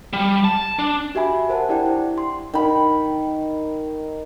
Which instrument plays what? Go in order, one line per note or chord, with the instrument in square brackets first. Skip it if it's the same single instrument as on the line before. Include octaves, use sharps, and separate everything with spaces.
[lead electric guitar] G3
A5
D4
[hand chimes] F#4 G4 E5 G#5 B5
A#4 C5 F#5 A5
D4 E4 G4 D5 F#5 G5
E4
C6
[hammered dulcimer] D#3 B5